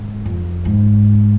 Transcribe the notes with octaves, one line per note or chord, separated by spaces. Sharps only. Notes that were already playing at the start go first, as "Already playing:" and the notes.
Already playing: G#2
F2
G#2